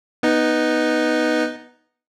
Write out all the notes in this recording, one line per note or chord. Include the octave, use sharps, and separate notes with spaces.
B3 D#4